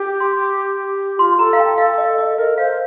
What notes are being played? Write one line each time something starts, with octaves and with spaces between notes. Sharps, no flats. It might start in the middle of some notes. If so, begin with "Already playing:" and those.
Already playing: G4
C6
F4 C6
A4 A#5
F5
G5
F5
D#5
D#5
A#4 D#5
C5 F5